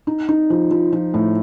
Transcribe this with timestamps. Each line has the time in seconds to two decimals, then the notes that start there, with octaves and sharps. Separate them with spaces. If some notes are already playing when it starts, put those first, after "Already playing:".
0.07 D#4
0.29 D#4
0.50 F3
0.71 F3
0.92 F3
1.14 A2